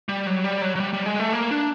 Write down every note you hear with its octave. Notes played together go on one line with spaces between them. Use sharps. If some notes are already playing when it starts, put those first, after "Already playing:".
G3
F#3
G3
F#3
F#3
G3
G3
G#3
A3
A#3
D4